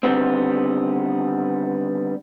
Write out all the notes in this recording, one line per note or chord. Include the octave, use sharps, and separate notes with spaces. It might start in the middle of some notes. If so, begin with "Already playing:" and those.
D3 D#3 G3 B3 C4